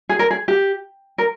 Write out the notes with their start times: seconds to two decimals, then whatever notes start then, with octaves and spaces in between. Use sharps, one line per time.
0.09 G#4
0.19 A#4
0.31 G#4
0.48 G4
1.18 A#4